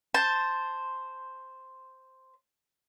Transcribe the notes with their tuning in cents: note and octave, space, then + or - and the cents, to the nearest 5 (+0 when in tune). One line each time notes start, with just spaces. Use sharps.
C5 +0 A5 +0